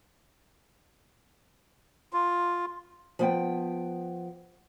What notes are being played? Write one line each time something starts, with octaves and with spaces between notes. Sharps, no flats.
F4
F3 B3 G5